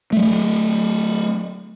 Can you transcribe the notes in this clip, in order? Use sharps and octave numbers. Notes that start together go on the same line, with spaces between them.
F#3 A3